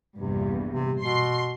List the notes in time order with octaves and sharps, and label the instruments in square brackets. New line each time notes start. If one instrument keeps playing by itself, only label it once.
[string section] A#1 E2 G2 [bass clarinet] C3
[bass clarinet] C3
[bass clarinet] B2 [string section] C6